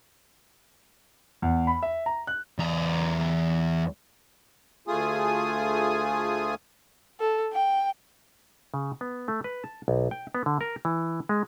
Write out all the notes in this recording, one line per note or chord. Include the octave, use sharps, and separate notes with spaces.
E2
B5
E5
A#5
F#6
E2 A#5
D2 A3 F4 G#4 G#5 D#6
A4
G5
C#3
B3
A3
B4
A5
B1
G5
B3
D3
A#4
E3
G#3